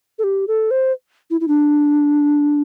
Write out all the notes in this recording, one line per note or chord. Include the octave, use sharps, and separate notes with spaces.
A4
G4
A4
C5
E4
E4
D4